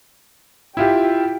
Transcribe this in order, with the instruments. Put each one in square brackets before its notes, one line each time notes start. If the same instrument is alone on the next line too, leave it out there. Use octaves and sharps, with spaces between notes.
[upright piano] E4 F4 G4 [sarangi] G5